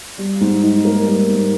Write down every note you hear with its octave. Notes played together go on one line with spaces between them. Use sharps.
G3
G#2
D#4
A#3
G3
G#2